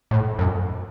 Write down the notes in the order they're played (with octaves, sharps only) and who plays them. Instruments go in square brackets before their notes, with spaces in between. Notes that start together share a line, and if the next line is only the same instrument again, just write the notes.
[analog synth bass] A2
F#2